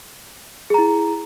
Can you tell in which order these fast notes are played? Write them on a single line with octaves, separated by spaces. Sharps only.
G#4 A#5 E4